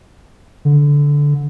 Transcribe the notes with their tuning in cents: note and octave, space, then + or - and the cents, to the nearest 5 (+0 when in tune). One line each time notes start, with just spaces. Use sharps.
D3 -15